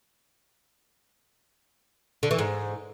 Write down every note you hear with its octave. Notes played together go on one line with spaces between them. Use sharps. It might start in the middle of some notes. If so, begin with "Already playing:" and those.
D3
E3
G#2